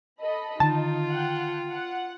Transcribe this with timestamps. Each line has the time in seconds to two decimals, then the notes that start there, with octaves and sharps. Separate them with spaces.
0.21 A4 D#5 B5
0.60 D3 D#3 D#4 F4 A5
1.10 F#5 G5
1.70 F#5